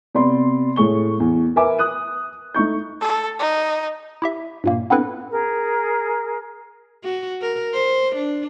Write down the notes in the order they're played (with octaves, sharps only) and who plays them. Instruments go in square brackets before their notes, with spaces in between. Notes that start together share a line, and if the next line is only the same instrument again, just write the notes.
[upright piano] C3 B3 D5 B5 C6
A2 G#4 C#6 G7
E2
A#4 B4 E5 G#5 D6
D#6 F#6 D#7
A3 D#4 C#6 G6
[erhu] A4
D#4
[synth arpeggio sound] E4 G4 E5
G2 A#2 A#3
B3 C4 D4 E4 A4 B4
[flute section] G#4 A#4
[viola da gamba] F#4
A#4
C5
D4